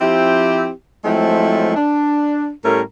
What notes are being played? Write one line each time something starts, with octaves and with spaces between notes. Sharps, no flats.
F3 C4 E4 G4
F3 F#3 G#3 A3 C4 E4
D4
A2 G3 A3 C#4 A#4